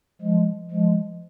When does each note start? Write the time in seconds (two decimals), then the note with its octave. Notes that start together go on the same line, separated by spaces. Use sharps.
0.22 F3 G#3
0.71 F3 G#3